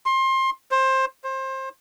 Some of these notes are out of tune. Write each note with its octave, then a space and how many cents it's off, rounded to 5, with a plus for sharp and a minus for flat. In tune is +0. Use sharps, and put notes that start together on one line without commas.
C6 +25
C5 +20
C5 +25